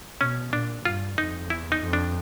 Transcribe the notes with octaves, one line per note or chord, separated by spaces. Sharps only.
B2 C#4
A#2 D4
G2 F4
F2 D#4
E2 E4
D#4
F2
D4